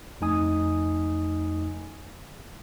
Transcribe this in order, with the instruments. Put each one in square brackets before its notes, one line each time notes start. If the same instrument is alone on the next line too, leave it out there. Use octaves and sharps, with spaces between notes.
[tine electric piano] F2 A3 D#4 G#5 D#6